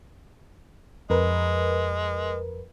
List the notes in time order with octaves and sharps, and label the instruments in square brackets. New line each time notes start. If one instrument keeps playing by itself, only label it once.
[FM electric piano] F2 A#4 B4 [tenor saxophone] G#3